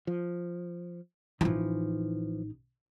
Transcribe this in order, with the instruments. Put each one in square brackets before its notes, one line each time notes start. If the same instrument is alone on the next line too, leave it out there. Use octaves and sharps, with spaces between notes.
[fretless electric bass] F3
[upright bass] A1 D#4 [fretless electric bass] E3 F3